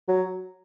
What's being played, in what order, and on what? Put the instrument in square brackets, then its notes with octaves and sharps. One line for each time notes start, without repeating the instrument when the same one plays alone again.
[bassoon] F#3